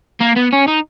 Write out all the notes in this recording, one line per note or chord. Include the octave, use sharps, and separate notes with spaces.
A#3
B3
C#4
D#4